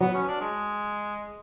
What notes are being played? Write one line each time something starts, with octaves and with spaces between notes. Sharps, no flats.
F#3 B3
C#4
D4
G#3